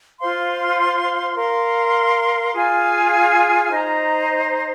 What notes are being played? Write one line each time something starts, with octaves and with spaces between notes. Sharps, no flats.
F4 C5 F5 C6
A#4 F5 C6
F4 G#4 F5 G#5
D#4 C5 D#5 A#5